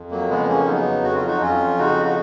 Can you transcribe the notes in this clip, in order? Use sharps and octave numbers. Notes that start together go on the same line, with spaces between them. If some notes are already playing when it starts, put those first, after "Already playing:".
Already playing: F2
F#3 A#3
C#3 G#3 B3
A#3 C#4
F#3 B3 D#4
F2 F#4
F4
D#4 F#4
F2 C#4 F4
C#3 D#4 F#4
F#4